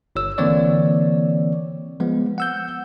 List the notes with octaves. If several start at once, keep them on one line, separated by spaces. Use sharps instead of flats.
G1 C#5 E6
D3 E3 A#3 C4 C#5 D5
F3 G#3 B3
F#5 E6 G6